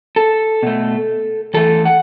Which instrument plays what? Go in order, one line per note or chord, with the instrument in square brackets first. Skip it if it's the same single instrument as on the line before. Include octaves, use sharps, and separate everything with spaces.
[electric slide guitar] A4
B2 A3
E2 E3 A3 A4
F#5